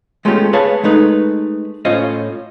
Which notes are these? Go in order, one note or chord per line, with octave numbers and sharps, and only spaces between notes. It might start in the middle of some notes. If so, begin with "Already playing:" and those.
G#3 A3 B3 C#4 F4 G4
G#4 B4 C#5 F5 A5
G#3 A3 D#4 B4
A2 C#4 F4 C5 D#5